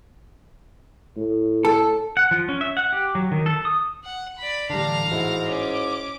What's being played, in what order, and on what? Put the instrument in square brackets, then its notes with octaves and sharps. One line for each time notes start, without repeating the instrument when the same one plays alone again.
[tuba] A2
[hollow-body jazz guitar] A4
[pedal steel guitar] F#5
F3
C#4
E5
F#5
G4
F#3
D#3
A4
D#6
[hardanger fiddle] F#5
D5 B5
[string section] A2 E3 [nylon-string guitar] D3 G3 [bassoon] D4 [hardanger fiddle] F5 A#5
[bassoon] G#2 [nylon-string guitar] E4 F#4
[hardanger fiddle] C#4 [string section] D6